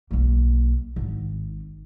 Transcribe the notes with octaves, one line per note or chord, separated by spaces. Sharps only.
B1 A#3
G#1